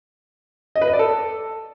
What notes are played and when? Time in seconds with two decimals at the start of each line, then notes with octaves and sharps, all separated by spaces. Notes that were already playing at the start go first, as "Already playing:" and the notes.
0.76 D#5
0.81 B4
0.87 D#5
0.93 D5
0.99 A4